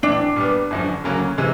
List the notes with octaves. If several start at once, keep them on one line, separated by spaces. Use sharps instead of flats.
A#1 A2 E3 D4
A#2 G3 B3
G1 F#2 D3 F3
D2 C#3 F#3 A#3 C#4
C3 E3 G#3